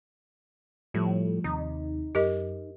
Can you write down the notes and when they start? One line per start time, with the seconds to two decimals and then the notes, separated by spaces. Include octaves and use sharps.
0.94 A2 F3 G3 A3
1.44 D#2 C3 D#4
2.15 F#2 G4 A#4 D#5